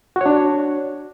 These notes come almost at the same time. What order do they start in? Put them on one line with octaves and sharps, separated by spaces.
F#4 C#5 D4